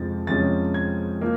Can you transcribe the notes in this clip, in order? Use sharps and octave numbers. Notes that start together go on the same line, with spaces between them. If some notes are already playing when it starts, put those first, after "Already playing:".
Already playing: F2 C3 F3 G#3 A6
F2 C3 F3 G#3 C#4 A6
G#6
F3 A#3